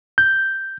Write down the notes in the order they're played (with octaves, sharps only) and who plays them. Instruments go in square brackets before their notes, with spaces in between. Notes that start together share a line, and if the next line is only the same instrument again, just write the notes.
[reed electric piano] G6